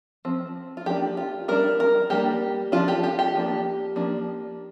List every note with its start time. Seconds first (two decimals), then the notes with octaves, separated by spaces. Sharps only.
0.25 F3 C4
0.77 F4
0.86 F3 A#3 D4 G4
1.17 F4
1.48 G3 D4 A#4
1.80 A#4
2.10 G3 A#3 D4 G4
2.72 F3 D4 F4
2.88 G4
3.03 G4
3.19 G4
3.35 F3 A#3 D4
3.96 F3 A#3 D4